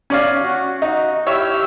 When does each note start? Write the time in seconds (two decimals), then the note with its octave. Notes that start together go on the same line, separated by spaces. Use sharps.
0.10 C#4 D5 F5
0.43 F#4
0.82 D#4 F#4
1.26 E4 G4 C#5 E5 E6 F6